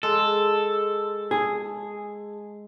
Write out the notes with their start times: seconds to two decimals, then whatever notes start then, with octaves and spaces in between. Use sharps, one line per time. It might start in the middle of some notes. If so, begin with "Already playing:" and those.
0.03 G#3 A4
1.31 G#4